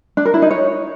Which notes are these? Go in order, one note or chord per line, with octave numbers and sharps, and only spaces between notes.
D4
A#4
E4
D#4
C#5